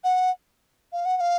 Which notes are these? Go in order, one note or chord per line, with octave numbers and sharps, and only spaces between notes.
F#5
F5
F#5
F#5
F5